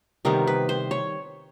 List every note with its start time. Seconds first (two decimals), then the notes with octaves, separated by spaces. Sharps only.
0.25 C3 D#3 G3 B3 A#4
0.47 B4
0.69 C5
0.91 C#5